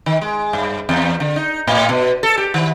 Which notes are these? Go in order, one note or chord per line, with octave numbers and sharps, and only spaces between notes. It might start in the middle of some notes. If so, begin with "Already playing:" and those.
D#3
G#3
G2
E2
D3
D#4
A2
B2
A4
G4
D#3